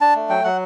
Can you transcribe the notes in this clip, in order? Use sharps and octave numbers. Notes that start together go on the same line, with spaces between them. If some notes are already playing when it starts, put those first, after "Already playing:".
D4 A5
A3
F#3 G5
F#3 F#5